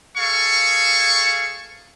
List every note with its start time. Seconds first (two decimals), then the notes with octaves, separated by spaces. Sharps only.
0.16 G#4 A4 F5 C#6